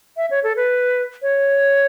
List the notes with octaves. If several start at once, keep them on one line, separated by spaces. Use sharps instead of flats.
E5
C#5
A4
B4
C#5